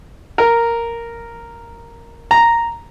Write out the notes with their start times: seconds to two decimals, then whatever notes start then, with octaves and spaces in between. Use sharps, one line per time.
0.38 A#4
2.31 A#5